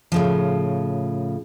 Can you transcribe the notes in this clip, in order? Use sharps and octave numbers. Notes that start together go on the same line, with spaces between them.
A2 C#3 F3